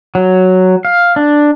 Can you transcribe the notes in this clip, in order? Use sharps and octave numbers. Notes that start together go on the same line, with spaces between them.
F#3
F5
D4